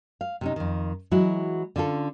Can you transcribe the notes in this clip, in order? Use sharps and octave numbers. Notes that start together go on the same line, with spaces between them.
F5
C3 C#4 D#4
F2 D#3
E3 F#3 G#3 E4 F#4
D3 C#4 F4 A4